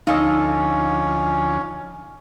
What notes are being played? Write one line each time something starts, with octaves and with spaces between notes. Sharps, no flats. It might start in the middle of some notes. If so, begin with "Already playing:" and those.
D2 F3 C#4 D#4 F4 A4 D#5